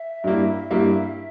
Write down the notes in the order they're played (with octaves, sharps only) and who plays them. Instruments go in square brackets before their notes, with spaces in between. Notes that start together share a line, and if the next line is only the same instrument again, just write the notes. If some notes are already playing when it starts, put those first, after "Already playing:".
Already playing: [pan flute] E5
[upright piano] G2 G3 A#3 E4
G2 G3 A#3 E4